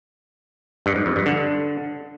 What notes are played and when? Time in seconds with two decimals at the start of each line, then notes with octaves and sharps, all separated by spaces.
0.86 G2
0.96 G#2
1.06 F2
1.16 G2
1.26 D3